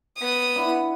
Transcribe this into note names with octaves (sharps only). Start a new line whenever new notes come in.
B3 D#6
D4 E4 F#5